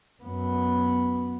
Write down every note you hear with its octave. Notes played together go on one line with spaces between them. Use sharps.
F#2 B3